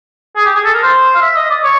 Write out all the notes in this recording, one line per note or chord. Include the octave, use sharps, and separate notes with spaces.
G#4
G4
G#4
A4
A#4
C5
F5
E5
D#5
D5
C#5